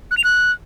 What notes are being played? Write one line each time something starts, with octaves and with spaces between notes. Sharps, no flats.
F#6
F7
F#6